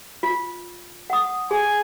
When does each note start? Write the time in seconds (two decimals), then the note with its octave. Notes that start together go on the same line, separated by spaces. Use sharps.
0.23 F4
1.10 F#5 D#6
1.51 G#4 G#5